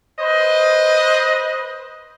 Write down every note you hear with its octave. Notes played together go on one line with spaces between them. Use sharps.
B4 C5 D#5